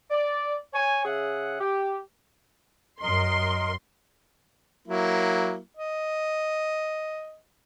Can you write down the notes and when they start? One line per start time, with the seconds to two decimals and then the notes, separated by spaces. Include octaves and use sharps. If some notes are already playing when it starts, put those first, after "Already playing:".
0.10 D5
0.73 C#5 G#5
1.04 C#3 G#4 E5 F#5
1.60 G4
3.02 F#2 A#4 D#5 C6
4.88 F#3 A#3 E4
5.77 D#5